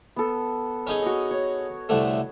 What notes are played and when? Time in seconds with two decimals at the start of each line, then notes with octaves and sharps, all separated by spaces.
0.16 B3 A4
0.87 C#4 D#4 G#4
1.02 F#4 D#5
1.31 C#5
1.89 C2 D3 A3